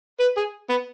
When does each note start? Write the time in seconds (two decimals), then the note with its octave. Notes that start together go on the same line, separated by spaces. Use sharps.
0.20 B4
0.37 G#4
0.69 B3